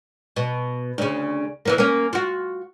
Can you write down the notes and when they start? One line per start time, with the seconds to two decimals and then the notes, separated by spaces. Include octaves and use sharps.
0.36 B2
0.98 D2 C#3
1.65 E3 F3 A#3
1.78 A#3 C#4
2.13 F4 F#4